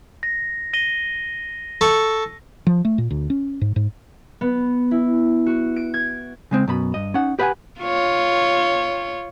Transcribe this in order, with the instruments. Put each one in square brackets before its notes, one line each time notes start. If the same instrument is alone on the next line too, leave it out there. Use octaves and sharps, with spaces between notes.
[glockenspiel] A#6
A#6 D#7 G7
[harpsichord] A4 C#6
[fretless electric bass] F3
A3
A#2
D2
C#4
G#2
G#2
[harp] B3
E4
F#4
D7
G#6
[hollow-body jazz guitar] C#3 G#3 C4
F#2 B2 B5
G2 D#5
C#4 D#4 F#5
G4 B4 D#5 F5 F#5 G#5
[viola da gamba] F4 C#5